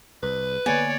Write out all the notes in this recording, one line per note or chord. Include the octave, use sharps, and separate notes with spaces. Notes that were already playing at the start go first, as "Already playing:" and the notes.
C2 B4
D3 A#3 B3 C#5 D5 G#5